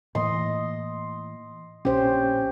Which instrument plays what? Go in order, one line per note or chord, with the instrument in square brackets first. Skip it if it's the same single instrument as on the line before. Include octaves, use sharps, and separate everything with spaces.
[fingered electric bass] A2 E3 A#3 [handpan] D#5 [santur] C6
[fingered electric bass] A#1 [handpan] C#4 C5 [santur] G4